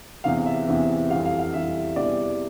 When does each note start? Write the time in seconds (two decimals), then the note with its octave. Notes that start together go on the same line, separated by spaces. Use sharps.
0.24 E2 C3 E3 F5
0.46 E5
0.67 E2 C3 E3
1.10 G3 F5
1.13 F2 E3
1.25 F5
1.39 F5
1.54 F2 E3 G3 E5
1.96 E2 C3 E3 G3 D5